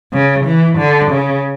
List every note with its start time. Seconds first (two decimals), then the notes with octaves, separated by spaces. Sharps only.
0.13 C#3
0.46 E3
0.79 D3
1.11 C#3